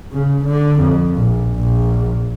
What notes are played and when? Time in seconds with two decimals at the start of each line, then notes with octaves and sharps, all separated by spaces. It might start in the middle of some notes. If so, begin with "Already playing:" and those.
0.13 C#3
0.45 D3
0.80 F2
1.16 A#1
1.56 A#1